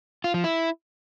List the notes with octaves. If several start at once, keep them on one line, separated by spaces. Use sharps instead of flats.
F4
F3
E4